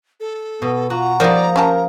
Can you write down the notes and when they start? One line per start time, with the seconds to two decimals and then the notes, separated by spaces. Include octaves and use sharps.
0.20 A4
0.62 B2 B3
0.90 F4 F#4 A#5
1.20 F3 G3 A#3 D#4 A#4 D5
1.56 C#4 G4 A#4 A5